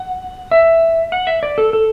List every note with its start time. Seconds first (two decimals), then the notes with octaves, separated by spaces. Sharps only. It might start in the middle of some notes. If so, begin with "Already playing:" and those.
Already playing: F#5
0.51 E5
1.12 F#5
1.27 E5
1.43 D5
1.58 A4
1.73 A4